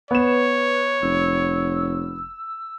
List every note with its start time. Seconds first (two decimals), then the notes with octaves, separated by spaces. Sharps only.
0.11 B3 B4 C#5 E7
1.02 F1 E6